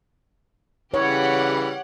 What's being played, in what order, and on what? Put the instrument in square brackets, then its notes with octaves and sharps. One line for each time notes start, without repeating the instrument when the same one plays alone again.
[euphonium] C#3 [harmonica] E3 G3 B4 [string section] G4 F#5 [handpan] C#5